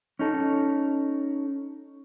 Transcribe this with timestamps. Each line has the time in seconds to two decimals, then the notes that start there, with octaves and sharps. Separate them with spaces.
0.19 C#4 D#4 A4